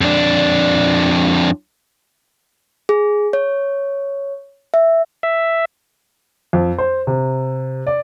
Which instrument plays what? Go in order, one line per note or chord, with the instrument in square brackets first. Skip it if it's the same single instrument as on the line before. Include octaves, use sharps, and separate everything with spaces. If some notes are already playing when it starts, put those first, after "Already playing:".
[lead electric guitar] F2 D4
[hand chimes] G#4
C#5
E5
[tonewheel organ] E5
[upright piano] F2
C5
C3
D5